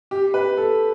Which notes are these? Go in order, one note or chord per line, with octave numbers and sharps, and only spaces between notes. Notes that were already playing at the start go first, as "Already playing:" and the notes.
G4
B4
A4